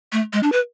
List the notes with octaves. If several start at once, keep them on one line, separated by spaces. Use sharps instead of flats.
A3
G#3
D4
B4